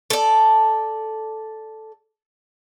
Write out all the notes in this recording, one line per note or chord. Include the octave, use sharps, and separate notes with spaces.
A4 D5